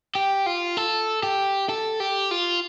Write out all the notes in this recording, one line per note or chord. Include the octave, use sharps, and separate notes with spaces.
G4
F4
A4
G4
A4
G4
F4